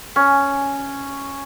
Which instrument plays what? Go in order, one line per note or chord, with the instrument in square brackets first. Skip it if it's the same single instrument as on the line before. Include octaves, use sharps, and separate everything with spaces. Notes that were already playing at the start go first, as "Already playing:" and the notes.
[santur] C#4